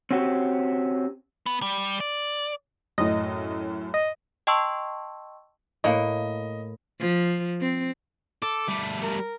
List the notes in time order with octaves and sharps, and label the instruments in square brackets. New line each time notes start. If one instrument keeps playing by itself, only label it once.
[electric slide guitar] C4 C#4 F#4 G4
[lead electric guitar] B3
G3
D5
[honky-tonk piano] F#2 A2 [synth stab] D#5
[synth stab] D#5
[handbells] D#5 G5 A5 C6 C#6 E6
[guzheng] A2 A#3 F#5 [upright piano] D#5
[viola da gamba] F3
C4
[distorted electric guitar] A4 [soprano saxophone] D6
[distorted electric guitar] G3 A3
[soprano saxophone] A#4